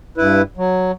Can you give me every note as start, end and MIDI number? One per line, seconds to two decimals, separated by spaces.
0.18 0.42 43
0.18 0.42 64
0.18 0.42 71
0.57 0.92 54